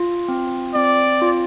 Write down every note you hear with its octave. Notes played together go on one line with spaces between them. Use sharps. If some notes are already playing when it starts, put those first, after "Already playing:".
Already playing: F4
C4
C4 D5
F4